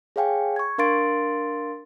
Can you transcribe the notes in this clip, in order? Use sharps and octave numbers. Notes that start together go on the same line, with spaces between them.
G#4 C#5 F5 G5 G#5
C#6 G#6
D4 A#4 F5 C6 A6 D7